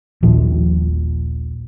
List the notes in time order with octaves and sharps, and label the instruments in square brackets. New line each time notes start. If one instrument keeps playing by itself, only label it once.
[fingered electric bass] D#1 A#1 F3